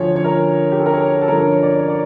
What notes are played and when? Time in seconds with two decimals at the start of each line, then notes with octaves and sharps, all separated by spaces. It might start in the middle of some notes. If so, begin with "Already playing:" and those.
Already playing: D2 D3 F3 C#5
0.16 C#5
0.24 A#4
0.72 G4
0.79 A4
0.86 A#4
0.93 C#5
1.21 A4
1.28 G2 D3 F3 A#4
1.40 C#5
1.51 C#5
1.63 D5
1.79 C#5
1.88 D5